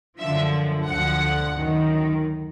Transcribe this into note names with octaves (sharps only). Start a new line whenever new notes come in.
F#2 D3 F3 E5
D2 D3 F3 F#5
F#2 D#3